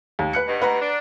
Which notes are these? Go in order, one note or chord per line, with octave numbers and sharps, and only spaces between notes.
D#2
B4 F#6 C#7
G2 B2
B4 F#5 A#5
D4